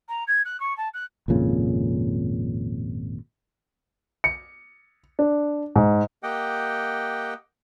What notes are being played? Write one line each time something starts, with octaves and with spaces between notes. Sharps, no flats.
A#5
G#6
F#6
C#6
A5
F#6
G#1 F2 A#2 C#3
C#7
D4
G#2
A#3 G4 D#5 F#5 G5